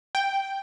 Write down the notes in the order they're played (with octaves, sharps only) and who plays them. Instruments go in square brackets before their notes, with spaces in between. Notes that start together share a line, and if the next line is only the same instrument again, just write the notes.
[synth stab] G5